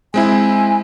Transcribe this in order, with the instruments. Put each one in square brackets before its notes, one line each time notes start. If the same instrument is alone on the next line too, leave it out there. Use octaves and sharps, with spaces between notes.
[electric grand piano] G#3 C4 E4 [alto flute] G#5